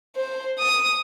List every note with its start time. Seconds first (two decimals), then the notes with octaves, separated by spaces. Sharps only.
0.16 C5
0.59 D#6